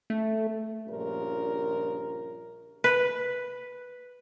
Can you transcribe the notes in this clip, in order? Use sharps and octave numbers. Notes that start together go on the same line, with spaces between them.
A3
A#1 G2 C#3 F4 A#4
B4